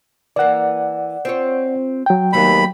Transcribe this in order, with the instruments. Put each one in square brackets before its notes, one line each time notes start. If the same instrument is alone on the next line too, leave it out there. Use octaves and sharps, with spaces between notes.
[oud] E3 A#3 [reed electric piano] D5 F#5
[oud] C4 F4 C#5
[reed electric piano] F#3 G5
[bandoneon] D#2 B5 [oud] G3 A3 B3